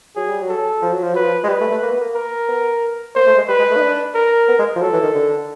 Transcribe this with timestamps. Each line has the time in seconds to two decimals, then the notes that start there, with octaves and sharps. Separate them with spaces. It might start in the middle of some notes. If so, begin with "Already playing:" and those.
0.16 F#3 G#4
0.29 G3
0.42 F#3
0.49 A4
0.82 F3
0.93 F#3
1.03 F3
1.14 F#3 B4
1.24 F3
1.44 G#3
1.48 G3 B4
1.61 A3
1.71 A3
1.82 A#3
1.91 B3
2.01 A#3
2.15 A#4
2.48 B3
3.15 A#3 C5
3.27 A3
3.37 G#3
3.48 G3 B4
3.59 G#3
3.71 A3
3.77 D#4
3.82 D4
4.15 A#4
4.48 B3
4.59 G#3
4.76 F3
4.81 F#3 A4
4.93 E3
5.04 D#3
5.15 D3